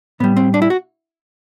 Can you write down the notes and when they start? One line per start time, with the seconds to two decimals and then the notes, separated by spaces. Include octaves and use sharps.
0.20 A2 G3 B3
0.37 C4
0.54 D4
0.62 E4
0.70 F#4